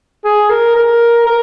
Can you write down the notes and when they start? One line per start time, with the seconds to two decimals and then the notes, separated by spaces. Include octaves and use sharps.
0.24 G#4
0.50 A#4
0.76 A#4
1.26 A#4